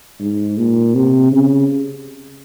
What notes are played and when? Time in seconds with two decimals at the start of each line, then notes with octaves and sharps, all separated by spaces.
0.20 G#2
0.58 A#2
0.95 C3
1.33 C#3